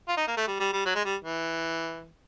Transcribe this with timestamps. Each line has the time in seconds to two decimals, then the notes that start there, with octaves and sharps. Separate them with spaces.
0.08 F4
0.17 D#4
0.28 A#3
0.37 A3
0.47 G3
0.60 G3
0.73 G3
0.86 F#3
0.95 G#3
1.05 G3
1.24 E3